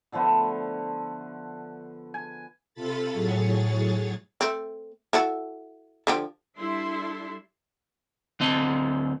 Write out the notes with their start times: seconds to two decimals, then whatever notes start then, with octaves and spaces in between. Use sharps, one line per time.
0.12 D3 F3 A3 B3
2.14 G#5
2.74 C3 F4 A4 B5 A6
3.11 A2 F#3 G#4 C#5 A6
4.41 A3 C4
5.13 E4 F#4 A4
6.07 D3 F3 G4
6.58 G3 D4 E4 A4 E5 C6
8.40 D2 C4 D#5